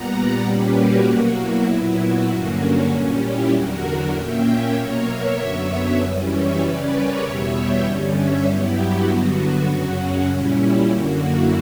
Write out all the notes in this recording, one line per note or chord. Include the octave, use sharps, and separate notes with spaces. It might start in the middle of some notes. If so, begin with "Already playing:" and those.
Already playing: A#2 G3 B3 F#5 A#5
D5 F#5
A#2 G3 A#3 C#4 G4 B4
F#4 A#4
B2 F#3 A#3 F#4
E4
A#2 F#3 B3 E4
F#4
G2 D3 F#3 A#3 C#4 F#4
A#2 G3 C#4
E4 G4
E2 D3 F#3 F#4 A#4
A#2 A#3 C#4 E5 G5
C#5 E5
B2 F#3 A#3 A#4 C#5
C#5 E5
F#2 D3 F#3 B3
F#2 E3 G3 C#4
C#5 E5
C#3 G3 C#4 B4 D5
A#4 C#5
E2 B2 G3 B3 C#5 E5
E5 G5
G2 D3 G3 C#4
C#5 E5
G2 F#3 B3 E4 G4
F#4
G2 D3 F#3 B3 F#4
F#4
F#2 C#3 F#3 C#4
A#2 G3 C#4 E4
F#2 D3 A#3 F#4
E4